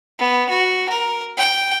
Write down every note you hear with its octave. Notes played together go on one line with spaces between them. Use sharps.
B3
F#4
A#4
G5